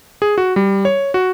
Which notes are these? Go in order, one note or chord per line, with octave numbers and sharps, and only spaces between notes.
G#4
F#4
G3
C#5
F#4